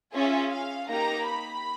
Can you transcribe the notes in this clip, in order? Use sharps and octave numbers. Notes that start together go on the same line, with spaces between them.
C#4 F4 G#4 E5
F5
A#3 D#4 G4 A#5
B5